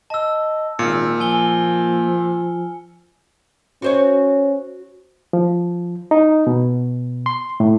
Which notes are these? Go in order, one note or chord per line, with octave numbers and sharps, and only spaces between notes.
D#5 A5 E6
G#1 A#2 A#3 F6 C#7
F3 G#5 G7
C#4 F#4 C5 C#5
F3
D#4
B2
C6
A2